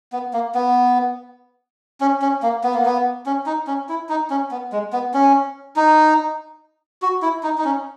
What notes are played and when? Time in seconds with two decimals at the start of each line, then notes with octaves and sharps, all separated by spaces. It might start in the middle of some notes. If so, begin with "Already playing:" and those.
0.12 B3
0.33 A#3
0.55 B3
2.01 C#4
2.22 C#4
2.43 A#3
2.64 B3
2.74 A#3
2.86 B3
3.26 C#4
3.46 D#4
3.67 C#4
3.89 E4
4.09 D#4
4.30 C#4
4.51 B3
4.73 G#3
4.93 B3
5.14 C#4
5.76 D#4
7.02 F#4
7.22 E4
7.43 D#4
7.58 D#4
7.64 C#4